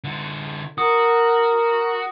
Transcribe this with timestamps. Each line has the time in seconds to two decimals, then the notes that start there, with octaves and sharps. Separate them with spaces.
0.04 D3 F4
0.78 F#4 A#4 D#6